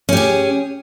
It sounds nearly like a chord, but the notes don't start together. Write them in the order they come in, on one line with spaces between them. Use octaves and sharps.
C#4 G4 G#4